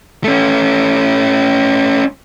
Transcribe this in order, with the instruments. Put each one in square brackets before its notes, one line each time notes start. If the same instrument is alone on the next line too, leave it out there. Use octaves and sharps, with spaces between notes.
[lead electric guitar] A3 C#4